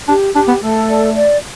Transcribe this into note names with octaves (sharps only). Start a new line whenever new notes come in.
D4 G4
D4 G4
B3
A3 A4
D5
D5